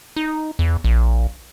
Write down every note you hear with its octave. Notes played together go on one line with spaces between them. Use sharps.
D#4
E2
A#1